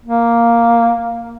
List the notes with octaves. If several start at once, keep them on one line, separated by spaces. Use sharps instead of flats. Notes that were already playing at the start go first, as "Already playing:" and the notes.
A#3